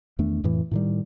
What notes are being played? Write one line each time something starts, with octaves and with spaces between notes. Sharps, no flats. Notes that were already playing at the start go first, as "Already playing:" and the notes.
E2 D#3 A3 D4
F2 A2 E3
A2 D#3 G3